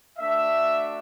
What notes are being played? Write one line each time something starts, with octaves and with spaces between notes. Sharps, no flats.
A3 D4 F#4 E5